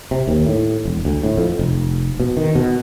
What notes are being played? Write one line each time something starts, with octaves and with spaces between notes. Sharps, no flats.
C3
D#2
A2
E1
D2
A2
F2
F1
B2
D#3
B2